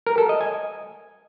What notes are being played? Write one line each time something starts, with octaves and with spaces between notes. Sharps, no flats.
A#4
A4
D#5
G#5